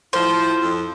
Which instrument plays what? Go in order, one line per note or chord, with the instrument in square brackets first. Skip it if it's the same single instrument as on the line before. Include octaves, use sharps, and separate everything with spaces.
[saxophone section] A2 F3 [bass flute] E4 [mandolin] C5
[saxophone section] F2